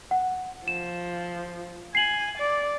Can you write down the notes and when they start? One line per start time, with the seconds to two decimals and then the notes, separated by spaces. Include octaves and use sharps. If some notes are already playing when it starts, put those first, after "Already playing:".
0.11 F#5
0.68 F3 E7
1.95 G#5 C7 F#7
2.38 D5